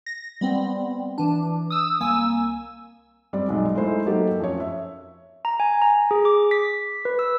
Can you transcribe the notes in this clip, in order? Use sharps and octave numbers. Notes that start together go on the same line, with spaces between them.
A#6
G3 B3 C4
E3 D4
D#6 E6
C2 A#3 G#5 E6
G3 C4 D5
B1 F#3 G#3 D#4
G#3 A3 D#4 E4 C5
F#3 A3 A#3 D#4 G4 A4
F2 C#4 C#5
E5
A#5
G#5
A#5
G#4
D6
B6
B4
E6